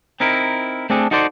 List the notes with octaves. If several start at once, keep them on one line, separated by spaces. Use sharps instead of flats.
C4 D#4 E4 A#4
A3 C4 D4 G#4 A4
D#4 F#4 A4 C5 D5 C6